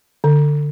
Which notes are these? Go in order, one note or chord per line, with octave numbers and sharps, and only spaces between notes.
D3